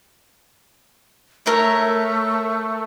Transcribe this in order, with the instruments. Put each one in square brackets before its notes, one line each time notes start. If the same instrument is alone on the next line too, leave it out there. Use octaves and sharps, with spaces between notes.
[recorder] A3 [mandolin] A#4 C#5 E5